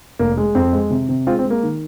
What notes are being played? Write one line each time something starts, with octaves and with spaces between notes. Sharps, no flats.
F1 A#3
G#3
F2 C4
G#3
C3
C3
G#3 C4 F4
C4
G#3
A#3
D#3